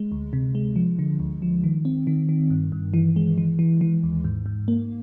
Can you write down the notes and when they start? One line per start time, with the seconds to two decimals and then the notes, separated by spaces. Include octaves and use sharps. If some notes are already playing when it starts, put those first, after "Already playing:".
Already playing: G#3
0.12 D2
0.33 C3
0.55 G#3
0.76 F3
0.99 D3
1.19 D2
1.42 F3
1.64 D#3
1.85 C4
2.07 D#3
2.29 D#3
2.50 G2
2.72 G2
2.94 E3
3.16 G#3
3.38 E3
3.59 E3
3.81 E3
4.03 D#2
4.24 G#2
4.46 G#2
4.68 A#3